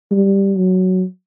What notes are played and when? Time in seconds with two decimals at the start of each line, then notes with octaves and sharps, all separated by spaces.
0.11 G3
0.56 F#3